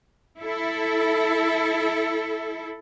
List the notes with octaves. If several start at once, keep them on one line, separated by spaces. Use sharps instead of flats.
E4 A4